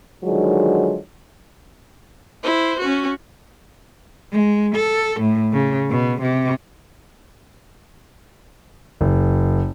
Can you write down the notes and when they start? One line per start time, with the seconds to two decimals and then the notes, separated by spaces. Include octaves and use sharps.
0.24 D3 D#3 F3 F#3 G#3
2.44 E4 C5
2.80 C#4 F#4
4.32 G#3
4.76 A4
5.21 A2
5.53 C#3
5.91 B2
6.22 C3
9.01 F#1